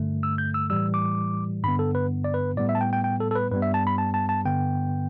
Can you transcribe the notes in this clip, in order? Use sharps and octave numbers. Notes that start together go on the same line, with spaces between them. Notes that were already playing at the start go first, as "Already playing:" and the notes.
Already playing: G2 D3 A3
E6
G6
E6
A2 E3 G3 E6
D6
G2 D3 B3 B5
A4
B4
D5
B4
A2 G3 B3 D5
E5
A5
G5
G5
G5
A4
A4
B4
G2 G3 B3 B4
E5
A5
B5
A5
A5
A5
G2 D3 B3 G5